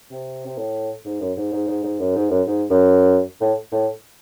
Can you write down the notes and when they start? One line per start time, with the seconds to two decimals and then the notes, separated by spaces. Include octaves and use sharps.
0.11 C3
0.46 C3
0.57 A2
1.05 G#2
1.21 F#2
1.37 G#2
1.52 G#2
1.67 G#2
1.83 G#2
1.99 F#2
2.15 G#2
2.30 F#2
2.46 G#2
2.70 F#2
3.41 A2
3.72 A2